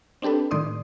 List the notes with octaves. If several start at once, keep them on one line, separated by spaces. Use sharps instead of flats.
C4 D4 G4 A4 B4
A2 D#3 D5 C6 D#6